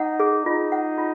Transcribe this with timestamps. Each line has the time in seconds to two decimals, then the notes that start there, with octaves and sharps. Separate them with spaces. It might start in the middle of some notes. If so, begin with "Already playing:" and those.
Already playing: D#4 F#5
0.19 G#4
0.45 D#4 F4
0.72 F#5
0.98 F4